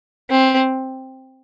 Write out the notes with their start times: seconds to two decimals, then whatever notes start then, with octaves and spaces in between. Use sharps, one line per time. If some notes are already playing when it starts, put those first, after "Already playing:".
0.30 C4